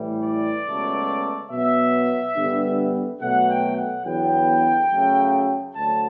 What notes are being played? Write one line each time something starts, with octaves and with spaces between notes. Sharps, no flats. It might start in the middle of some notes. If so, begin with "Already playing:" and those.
Already playing: A2 E3 G3
D5
C#2 B2 F#3 A3
B2 F#3 B3 E5
G2 D3 G3 B3
B2 F#3 A3 F#5
G5
F#5
E2 D3 F#3 B3 G5
F#2 C#3 F#3 A3
D2 D3 F#3 A5